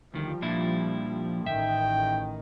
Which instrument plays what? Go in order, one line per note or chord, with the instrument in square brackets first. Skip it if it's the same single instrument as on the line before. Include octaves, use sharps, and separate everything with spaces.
[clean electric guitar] D2 D#3 [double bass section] F3 G3
[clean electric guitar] A#2 D4 E4
[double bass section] A1 D#3 [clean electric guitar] E5 [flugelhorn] G5